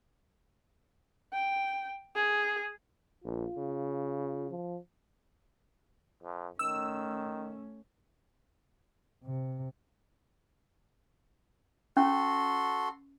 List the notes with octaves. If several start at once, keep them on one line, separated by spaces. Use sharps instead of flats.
G5
G#4
A#1 F4
C#3
F3
F2
D#3 A3 C#4 E6
C3
C#4 F#4 A4 C6